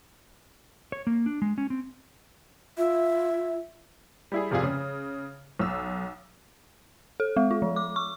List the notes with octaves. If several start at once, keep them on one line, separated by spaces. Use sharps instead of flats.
C#5
A#3
D4
G#3
C#4
C4
F4 E5
G3 E4 G#4
F1 C3 F4 G#4
C#3
B1 E6
A4
G#3
F4
F3
D6
C#6